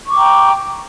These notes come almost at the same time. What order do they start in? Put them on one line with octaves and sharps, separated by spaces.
C#6 D6 G5 A#5